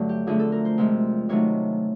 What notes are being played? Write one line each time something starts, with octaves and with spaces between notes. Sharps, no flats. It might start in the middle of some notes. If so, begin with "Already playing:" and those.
Already playing: G2 D3 F#3 A3
G4
F2 D3 F3 A3 G#4
A4
A#4
C5
C3 F3 G#3
C3 D#3 F#3 A3 C#5